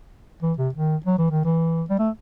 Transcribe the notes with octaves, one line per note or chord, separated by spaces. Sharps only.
E3
C3
D#3
F#3
E3
D#3
E3
G3
A3